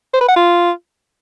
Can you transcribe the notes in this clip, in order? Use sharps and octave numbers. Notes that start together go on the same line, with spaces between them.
C5
B4
F#5
F4